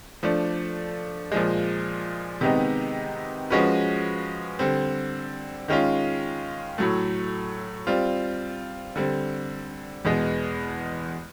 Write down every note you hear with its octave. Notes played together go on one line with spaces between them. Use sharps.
F3 A3 D4
A#2 F3 G#3
C3 D#3 G#3 B3 D#4
F3 G#3 C#4 F#4 B4
D3 G3 C4
D#3 G#3 C#4 F4
A2 F#3 A3
G3 C4 F4
D3 G3 C4
E2 B2 G#3 B3